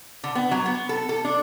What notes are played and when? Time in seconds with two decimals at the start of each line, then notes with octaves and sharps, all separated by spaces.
0.24 D3
0.35 B3
0.51 F#3
0.66 B3
0.89 A4
1.09 A4
1.25 D4